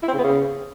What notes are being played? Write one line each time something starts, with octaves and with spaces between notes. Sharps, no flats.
E4
C4
C#3
B3
C#3